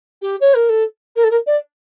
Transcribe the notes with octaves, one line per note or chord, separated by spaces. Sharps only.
G4
C#5
A#4
A4
A#4
A4
A#4
D5